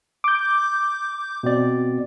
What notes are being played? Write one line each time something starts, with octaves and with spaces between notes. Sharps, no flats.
D6 G6
B2 C4 D5